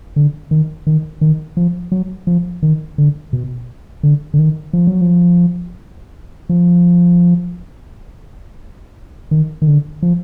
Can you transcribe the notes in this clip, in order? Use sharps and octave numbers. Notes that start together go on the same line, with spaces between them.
D3
D#3
D#3
D#3
F3
F#3
F3
D#3
D3
B2
D3
D3
D#3
F3
F#3
F3
F3
D#3
D#3
D3
F3